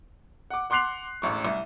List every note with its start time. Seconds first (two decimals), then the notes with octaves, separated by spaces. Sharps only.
0.50 F#5 D6
0.70 F#5 C6 D6 F#6 C7 F7
1.22 E1 A1 C#6
1.45 C2